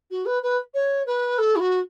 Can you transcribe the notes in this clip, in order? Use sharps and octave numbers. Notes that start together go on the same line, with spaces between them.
F#4
B4
B4
C#5
B4
A4
E4
F#4